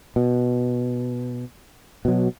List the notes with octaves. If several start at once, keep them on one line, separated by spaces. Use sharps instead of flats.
B2
B2 F#3